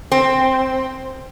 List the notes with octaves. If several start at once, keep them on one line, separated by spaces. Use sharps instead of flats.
C4